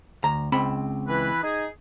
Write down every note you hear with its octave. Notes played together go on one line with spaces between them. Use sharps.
D2 A#5
C#2 C4 B5
E3 B4
D#4 G#4